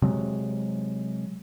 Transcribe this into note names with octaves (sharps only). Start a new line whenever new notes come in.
C3 F#3 G#3